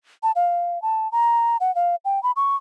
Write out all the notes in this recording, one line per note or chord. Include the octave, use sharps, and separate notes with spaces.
A5
F5
A5
A#5
F#5
F5
G5
B5
C#6